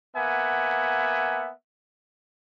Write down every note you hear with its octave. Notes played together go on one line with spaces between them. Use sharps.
A#3 B3 E5 F#5 G#5